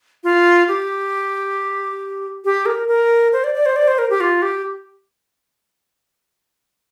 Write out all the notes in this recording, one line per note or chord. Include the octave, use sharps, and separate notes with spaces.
F4
G4
G4
A#4
A#4
C5
D5
D5
C5
D5
C5
A#4
G4
F4
G4